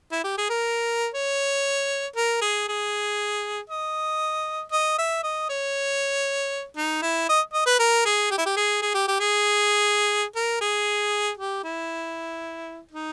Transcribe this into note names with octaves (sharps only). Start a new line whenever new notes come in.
E4
G4
G#4
A#4
C#5
A#4
G#4
G#4
D#5
D#5
E5
D#5
C#5
D#4
E4
D#5
D#5
B4
A#4
G#4
G4
E4
G4
G#4
G#4
G4
G4
G#4
A#4
G#4
G4
E4
D#4